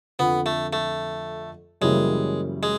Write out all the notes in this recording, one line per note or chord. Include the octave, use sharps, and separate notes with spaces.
F2 D3 F3 B3
A3
A3
F#2 C#3 E3 G3 G#3 A#3
G#3